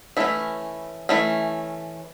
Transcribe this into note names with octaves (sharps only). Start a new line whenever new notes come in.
E3 A3 C#4 E4
E3 A3 C#4